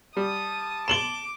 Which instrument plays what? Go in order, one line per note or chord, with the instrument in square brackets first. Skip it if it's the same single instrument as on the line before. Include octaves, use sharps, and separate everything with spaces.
[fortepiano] G3 [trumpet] A5 [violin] D#6
[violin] D6 [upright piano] E7 F#7 G7